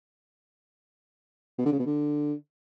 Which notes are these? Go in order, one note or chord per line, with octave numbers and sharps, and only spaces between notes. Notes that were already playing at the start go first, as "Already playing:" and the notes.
B2
D3
C#3
B2
D3